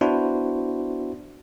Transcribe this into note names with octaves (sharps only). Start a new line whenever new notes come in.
B3 D4 E4 F#4 C5